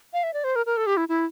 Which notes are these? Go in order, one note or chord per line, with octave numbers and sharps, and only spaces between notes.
F5
E5
D5
C5
A#4
A#4
A4
G4
E4
E4